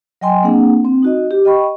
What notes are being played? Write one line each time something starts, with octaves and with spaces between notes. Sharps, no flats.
F#3 D#5 G5 G#5 C6
A#3 C4 D4 G#4 F#5
C4
D#4 F#4 D#5
G4
D#5 G5 B5 C#6